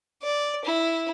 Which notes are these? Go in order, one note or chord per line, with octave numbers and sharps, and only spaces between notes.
D5
E4